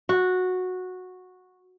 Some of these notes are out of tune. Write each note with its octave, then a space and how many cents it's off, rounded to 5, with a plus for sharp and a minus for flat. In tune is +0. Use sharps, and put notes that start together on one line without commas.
F#4 -10